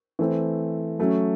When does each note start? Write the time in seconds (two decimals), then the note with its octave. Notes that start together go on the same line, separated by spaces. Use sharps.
0.19 E3 A3 C4
0.99 F#3 A3 C#4